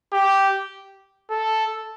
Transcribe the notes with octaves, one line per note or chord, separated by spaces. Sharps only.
G4
A4